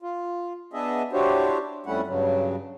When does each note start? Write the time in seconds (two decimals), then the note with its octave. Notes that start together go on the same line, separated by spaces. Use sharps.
0.02 F4
0.73 B3 D4 G#4 D#5 E5
1.13 D4 E4 F#4 G4 C5 C#5
1.86 F2 G3 A3 C#4 E4 F#5
2.07 G2 C#3 F#3